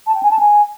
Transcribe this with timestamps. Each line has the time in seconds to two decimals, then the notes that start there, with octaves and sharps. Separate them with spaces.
0.07 A5
0.15 G5
0.23 G#5
0.31 A5
0.39 G#5